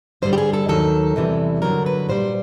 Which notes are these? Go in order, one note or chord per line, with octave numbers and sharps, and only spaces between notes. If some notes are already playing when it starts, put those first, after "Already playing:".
G2 D3 G3 C5
G4
G#4
A4
D#2 D#3 F#3 A4
E2 C3 E3 G3
G2 D3 F#3 A#4
B4
A#2 G3 C5